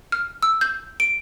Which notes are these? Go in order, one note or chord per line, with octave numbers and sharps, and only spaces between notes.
F6
E6
G6
D7